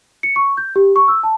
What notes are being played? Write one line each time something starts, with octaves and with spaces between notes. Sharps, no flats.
C#7
C#6
G6
G4
C#6
E6
A5